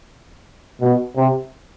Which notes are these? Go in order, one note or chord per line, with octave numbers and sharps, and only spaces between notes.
B2
C3